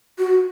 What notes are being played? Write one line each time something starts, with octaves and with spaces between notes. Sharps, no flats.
F#4